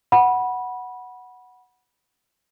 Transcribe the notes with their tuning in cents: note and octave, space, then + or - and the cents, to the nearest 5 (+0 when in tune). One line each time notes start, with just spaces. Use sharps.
F#5 +0 B5 -20